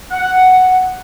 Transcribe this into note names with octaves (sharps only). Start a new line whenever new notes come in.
F#5